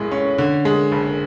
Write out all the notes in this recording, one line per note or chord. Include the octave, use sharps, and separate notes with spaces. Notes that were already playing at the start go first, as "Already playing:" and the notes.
Already playing: B1 A2 G#3
C#4
D3
G#3
F#1